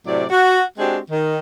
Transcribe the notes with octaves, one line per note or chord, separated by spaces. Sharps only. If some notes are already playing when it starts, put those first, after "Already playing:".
A2 C3 F#3 D5
F#4
G#3 C4 D4 F#4 G4
D#3